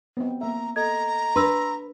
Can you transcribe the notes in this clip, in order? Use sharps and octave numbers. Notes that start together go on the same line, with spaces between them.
B3 C4
A#3 E5 A#5
A4 D#5 A#5 G#6
D4 B4 C6 E6